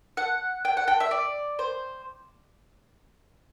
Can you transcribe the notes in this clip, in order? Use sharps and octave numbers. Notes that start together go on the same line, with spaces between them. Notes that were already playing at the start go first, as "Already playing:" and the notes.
F#5
G5
F#5
G5
E5
D5
C5